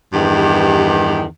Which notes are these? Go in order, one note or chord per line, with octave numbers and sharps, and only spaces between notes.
E2 G2 D#3 G4